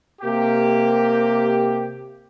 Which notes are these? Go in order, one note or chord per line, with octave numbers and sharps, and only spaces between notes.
C3 A#3 G4